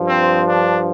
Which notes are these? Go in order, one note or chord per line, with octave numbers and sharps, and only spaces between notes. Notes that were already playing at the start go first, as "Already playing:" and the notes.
Already playing: G2 F3
C4
D4